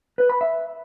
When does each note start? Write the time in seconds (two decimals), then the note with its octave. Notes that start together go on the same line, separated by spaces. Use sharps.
0.18 B4
0.29 B5
0.41 E5